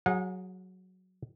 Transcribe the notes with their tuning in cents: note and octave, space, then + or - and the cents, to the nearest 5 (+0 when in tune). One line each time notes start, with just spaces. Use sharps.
F#3 +0 G#4 +0 F#5 -40